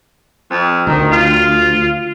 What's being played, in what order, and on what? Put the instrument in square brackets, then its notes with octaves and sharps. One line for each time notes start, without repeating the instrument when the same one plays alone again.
[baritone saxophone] F2
[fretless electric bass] D2 [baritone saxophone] D#3
[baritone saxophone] F4